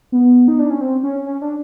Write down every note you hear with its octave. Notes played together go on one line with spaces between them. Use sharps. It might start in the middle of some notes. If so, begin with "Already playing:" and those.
B3
D#4
D4
C#4
C4
C#4
C#4
D4